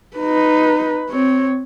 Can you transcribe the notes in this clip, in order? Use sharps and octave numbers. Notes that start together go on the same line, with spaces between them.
D#4 B4
C4 C#5